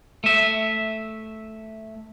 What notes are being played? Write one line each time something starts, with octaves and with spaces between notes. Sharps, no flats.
A3 E5